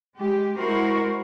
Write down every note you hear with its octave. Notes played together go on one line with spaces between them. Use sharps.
G#3 G4
G#3 E4 F#4 A#4 C5